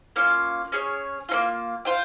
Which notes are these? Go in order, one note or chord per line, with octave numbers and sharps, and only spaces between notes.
A#3 C#4 F4
C#4 G#4 C#5
A#3 C#4 F4
F4 C5 G5